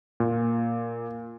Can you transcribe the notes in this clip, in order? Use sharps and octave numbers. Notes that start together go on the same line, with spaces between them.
A#2